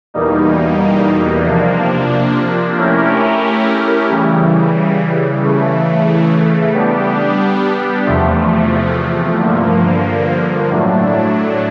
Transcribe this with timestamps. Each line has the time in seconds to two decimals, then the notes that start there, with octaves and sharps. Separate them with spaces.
0.14 E2 B2 G3 A#3 D#4
1.45 C3 F3 A#3 D4
2.77 A3 C#4 E4 G4 A#4
4.10 C#3 E3 G3
5.42 C#3 E3 A3
6.73 G3 B3 D4 G4
8.06 E2 C3 F3 A3
9.38 G2 D3 F3 A#3
10.70 A2 F#3 A3 D4